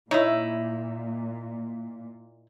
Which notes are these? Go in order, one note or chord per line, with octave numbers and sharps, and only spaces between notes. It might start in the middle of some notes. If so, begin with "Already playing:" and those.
A#2 D#4 E4 C#5 D#5 E5